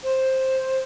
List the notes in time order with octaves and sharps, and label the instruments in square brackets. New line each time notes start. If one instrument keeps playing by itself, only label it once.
[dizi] C5